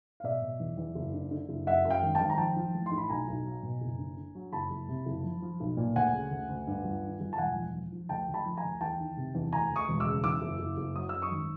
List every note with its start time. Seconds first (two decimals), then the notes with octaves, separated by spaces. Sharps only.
0.20 F5
0.24 B2 D5 E5
0.42 B2
0.60 E2
0.78 E2
0.95 F#1
1.14 D3
1.31 D3
1.49 F#1
1.67 F#2 E5 F#5
1.85 F#2
1.90 F5 G5
2.03 G#1
2.15 G5 A5
2.21 G#1
2.30 A#5
2.38 F3 G5 A5
2.56 F3
2.74 A1
2.86 C6
2.91 A2
2.98 B5
3.09 B1 G#5 A#5
3.28 B1
3.45 F#3
3.63 B2
3.81 F#1
3.99 D3
4.17 D3
4.35 F#3
4.52 F#1 A5 B5
4.71 F#1
4.88 C3
5.06 F#1
5.24 F3
5.42 F3
5.60 B1
5.77 A#2
5.95 D2 F#5 G#5
6.13 C#3
6.31 D2
6.49 D2
6.67 G2
6.84 G1
7.03 D#3
7.21 G1
7.33 A5
7.38 E1 F#5 G#5
7.56 F3
7.74 F3
7.92 F3
8.09 D2 G5 A5
8.28 D2
8.34 A5 B5
8.46 F3
8.57 G#5 A#5
8.63 D2
8.81 E2 G5 A5
8.99 D#3
9.17 C3
9.35 E2
9.53 D2 G#5 A#5
9.71 D2
9.76 C#6 D#6
9.88 E1
10.00 D6 E6
10.06 C#3
10.24 E2 D6 E6
10.42 F#1
10.59 F#1
10.77 F#1
10.96 F#3 D#6
11.09 F#2 E6
11.22 C#6 D#6
11.31 G#1